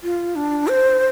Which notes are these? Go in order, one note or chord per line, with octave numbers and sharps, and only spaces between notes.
F4
D4
C5